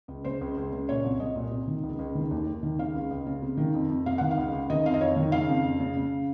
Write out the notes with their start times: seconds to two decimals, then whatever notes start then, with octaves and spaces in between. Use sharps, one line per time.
0.08 C#2
0.24 C#3 C5
0.41 C#2
0.57 C#2
0.72 C#3
0.89 A#2 C#5
1.04 C2
1.20 C2 D#5
1.36 A#2
1.51 C3
1.67 D#3
1.83 C#2
1.99 C#2
2.15 D#3
2.31 D#2
2.47 D#2
2.63 D#3
2.79 C#3 F5
2.94 C#2
3.11 C#2
3.26 C#3
3.42 C3
3.57 D#3
3.74 F2
3.90 F2
4.06 C3 F5
4.18 D#3 F#5
4.31 F5
4.37 C#2
4.53 C#2
4.70 D#3 D#5
4.85 F2 F5
4.94 D#5
5.01 F2 C#5
5.16 D#3
5.32 C#3 F5
5.49 F2
5.65 F2
5.80 C#3
5.96 C#3